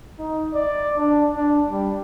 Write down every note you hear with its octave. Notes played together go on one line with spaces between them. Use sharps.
D#4
D5
D4
D4
G3